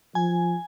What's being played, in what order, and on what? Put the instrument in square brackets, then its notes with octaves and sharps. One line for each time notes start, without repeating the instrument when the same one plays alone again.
[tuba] F3 [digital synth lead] G#5